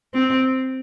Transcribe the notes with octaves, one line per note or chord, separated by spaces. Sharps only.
C4